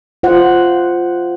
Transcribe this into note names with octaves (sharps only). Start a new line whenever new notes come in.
F4 C5 F#5